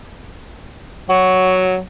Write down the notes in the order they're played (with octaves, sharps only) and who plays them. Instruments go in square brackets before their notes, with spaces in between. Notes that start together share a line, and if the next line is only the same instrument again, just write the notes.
[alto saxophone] F#3 [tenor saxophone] F#4